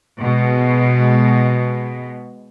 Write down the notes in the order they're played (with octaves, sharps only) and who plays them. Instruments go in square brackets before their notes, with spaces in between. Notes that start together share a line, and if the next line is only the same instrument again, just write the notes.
[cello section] B2 G#3